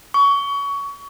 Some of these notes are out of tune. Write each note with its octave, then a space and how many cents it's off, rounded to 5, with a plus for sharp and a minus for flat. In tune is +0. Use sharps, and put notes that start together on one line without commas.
C#6 +25